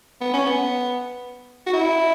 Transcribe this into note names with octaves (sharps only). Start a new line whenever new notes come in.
B3
C#4
B3
F#4
E4